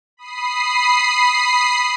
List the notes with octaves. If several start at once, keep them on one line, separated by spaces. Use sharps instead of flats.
B5 D#6 C7